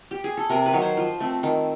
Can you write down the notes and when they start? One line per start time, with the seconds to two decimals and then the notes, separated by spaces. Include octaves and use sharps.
0.11 G4
0.24 G#4
0.37 A4
0.50 C3 A#4
0.66 B4
0.73 D#3 F#3 C#5
0.82 C5
0.97 F3
1.20 A3 C4
1.43 D#3